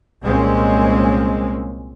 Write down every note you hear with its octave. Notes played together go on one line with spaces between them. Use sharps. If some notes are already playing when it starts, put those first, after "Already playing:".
C2 A#2 G#3 A#3 C4 C#4